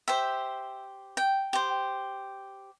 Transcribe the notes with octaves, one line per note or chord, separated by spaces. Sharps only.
G4 C5 E5
G5
G4 C5